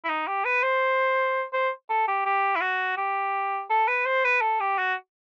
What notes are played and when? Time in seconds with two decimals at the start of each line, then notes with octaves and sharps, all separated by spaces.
0.04 E4
0.09 D#4
0.27 G4
0.45 B4
0.63 C5
1.53 C5
1.90 A4
2.08 G4
2.25 G4
2.56 E4
2.61 F#4
2.97 G4
3.70 A4
3.88 B4
4.06 C5
4.24 B4
4.41 A4
4.60 G4
4.78 F#4